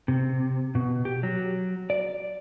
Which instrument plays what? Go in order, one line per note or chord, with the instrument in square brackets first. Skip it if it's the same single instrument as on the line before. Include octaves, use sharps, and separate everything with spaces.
[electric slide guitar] C3
B2
G4
F#3
D5